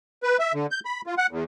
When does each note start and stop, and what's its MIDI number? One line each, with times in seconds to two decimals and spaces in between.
0.23 0.37 71
0.39 0.53 76
0.54 0.67 50
0.71 0.80 91
0.85 1.01 83
1.06 1.15 65
1.18 1.27 78
1.31 1.44 40